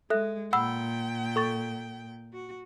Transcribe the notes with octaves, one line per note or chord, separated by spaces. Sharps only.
G#3 A4 E5 F#6
A#2 F#5 G5 B5 E6
A4 C#6 A6
F#4